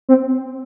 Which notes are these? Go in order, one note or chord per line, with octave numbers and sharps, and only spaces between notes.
C4